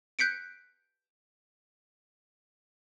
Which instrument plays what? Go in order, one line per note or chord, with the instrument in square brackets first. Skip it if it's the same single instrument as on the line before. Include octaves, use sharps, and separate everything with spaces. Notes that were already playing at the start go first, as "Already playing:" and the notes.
[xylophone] F#6 G6 B6 C#7 D7